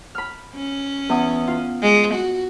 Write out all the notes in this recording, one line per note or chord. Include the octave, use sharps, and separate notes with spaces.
B5 F6
C#4
E2 D#6
F4
G#3
F#4